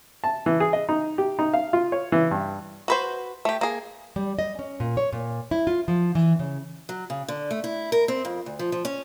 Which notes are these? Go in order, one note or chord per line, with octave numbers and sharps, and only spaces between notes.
A5
E3
G#4
D#5
D#4
G4
D#4
F5
F4
C#5
E3
G2
F#4 B4 C5
A3 G4
A#3 G#4
G3
D#5
C#4
A#2
C#5
A#2
E4
F4
F3
E3
C#3
F#3
C#3
D3
A3
E4
A#4
C4
F2
D2
F3
F3
C#4